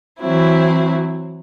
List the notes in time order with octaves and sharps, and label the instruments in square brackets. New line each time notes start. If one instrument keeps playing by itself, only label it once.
[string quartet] E3 F#3 C4 E4